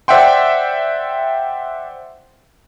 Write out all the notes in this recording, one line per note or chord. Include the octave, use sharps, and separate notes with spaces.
C5 D5 E5 F#5 G5 C6